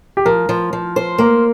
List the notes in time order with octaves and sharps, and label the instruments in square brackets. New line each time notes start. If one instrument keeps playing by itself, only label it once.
[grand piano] G4
[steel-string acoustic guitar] F3 [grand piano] A#4
[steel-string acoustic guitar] F3
F3
C5
[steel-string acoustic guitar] A#3 [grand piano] A#4